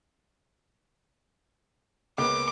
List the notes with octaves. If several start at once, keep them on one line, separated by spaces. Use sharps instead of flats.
C#2 A#3 B3 D6